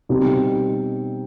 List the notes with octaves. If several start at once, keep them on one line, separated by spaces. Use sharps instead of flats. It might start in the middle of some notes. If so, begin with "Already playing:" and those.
B2 G3 C4 D#4 G4